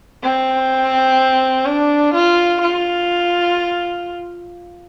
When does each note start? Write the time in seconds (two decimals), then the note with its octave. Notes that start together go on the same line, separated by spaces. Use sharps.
0.23 C4
1.66 D4
2.14 F4
2.62 F4